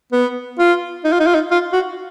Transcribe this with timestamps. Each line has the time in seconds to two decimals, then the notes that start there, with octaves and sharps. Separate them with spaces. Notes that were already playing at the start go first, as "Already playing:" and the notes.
0.13 B3
0.59 F4
1.04 D#4
1.12 F4
1.20 D#4
1.27 F4
1.35 D#4
1.51 F4
1.73 F#4